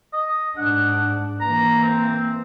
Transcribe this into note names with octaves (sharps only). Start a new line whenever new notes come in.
D#5
G#2 D4 F#5
E3 A#3 A#5
C4